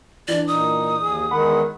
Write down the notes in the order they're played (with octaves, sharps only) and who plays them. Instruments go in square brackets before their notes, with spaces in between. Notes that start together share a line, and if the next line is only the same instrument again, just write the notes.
[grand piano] E3 D4 [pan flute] D5
[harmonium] A#2 D#4 [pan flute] D#6
[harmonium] D#2 G#4
[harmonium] E2 G#3 F#5 [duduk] D#3 [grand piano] B5